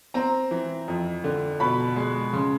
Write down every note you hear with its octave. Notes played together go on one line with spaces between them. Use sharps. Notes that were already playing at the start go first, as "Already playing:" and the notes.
C4 A#5
E3
F2
D3
B2 B5
G#3
C#3 C6